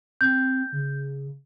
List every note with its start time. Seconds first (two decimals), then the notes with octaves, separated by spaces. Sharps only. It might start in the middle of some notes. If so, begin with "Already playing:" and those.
0.21 C4 G6
0.72 C#3